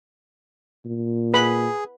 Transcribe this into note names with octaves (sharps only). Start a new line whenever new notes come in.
A#2
G#4 B4 B5